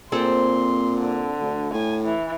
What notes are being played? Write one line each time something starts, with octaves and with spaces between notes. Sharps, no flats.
A#2 C4 G#4 A4 C6
D3
D2
A2 G#5
E3